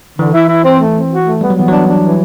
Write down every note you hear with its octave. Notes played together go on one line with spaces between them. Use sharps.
D3 E3
E4
E4
C4
A3
C4
F#4
A3
G3 B3
F#3
E3 B3
F#3 D4
D4
E3